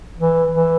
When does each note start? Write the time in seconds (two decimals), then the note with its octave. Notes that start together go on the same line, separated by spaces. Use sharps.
0.19 E3
0.54 E3